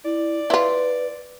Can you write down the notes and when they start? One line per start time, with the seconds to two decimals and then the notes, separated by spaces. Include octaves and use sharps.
0.05 E4 D5
0.50 E4 F4 B4